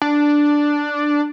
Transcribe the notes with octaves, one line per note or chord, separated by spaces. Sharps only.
D4